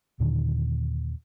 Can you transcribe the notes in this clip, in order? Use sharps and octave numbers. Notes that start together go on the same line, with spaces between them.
D#2 A#2 D3 D#3